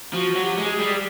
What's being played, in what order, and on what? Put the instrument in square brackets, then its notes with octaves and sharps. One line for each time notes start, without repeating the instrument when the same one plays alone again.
[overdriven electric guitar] F3 [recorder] F#4
[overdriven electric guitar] F#3
[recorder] G4
[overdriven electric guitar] G#3
[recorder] G#4
[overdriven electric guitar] G3
[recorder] G4